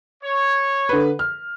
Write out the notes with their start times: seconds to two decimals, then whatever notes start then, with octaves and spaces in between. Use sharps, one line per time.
0.23 C#5
0.89 D3 B4
1.19 F6